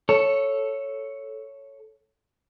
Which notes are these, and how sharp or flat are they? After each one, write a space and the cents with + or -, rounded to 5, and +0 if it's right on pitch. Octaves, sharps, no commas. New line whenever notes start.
A4 +0 C#5 +0